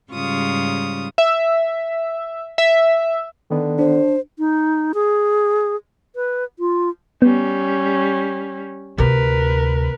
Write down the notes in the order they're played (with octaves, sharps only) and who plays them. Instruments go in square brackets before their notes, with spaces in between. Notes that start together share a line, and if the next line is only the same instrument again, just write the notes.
[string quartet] G#2 C#3 G3 F4 C#6 D#6
[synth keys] E5
E5
[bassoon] D3 [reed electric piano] D#3 B3
[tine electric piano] D4 [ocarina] C5
[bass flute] D#4
G#4
B4
F4
[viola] G3 C#4 [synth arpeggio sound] B3
[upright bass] D2 C3 [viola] A#4 B4